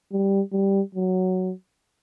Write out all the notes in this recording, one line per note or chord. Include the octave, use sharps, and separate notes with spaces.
G3
G3
F#3